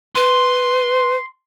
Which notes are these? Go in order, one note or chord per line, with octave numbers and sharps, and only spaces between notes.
B4 C6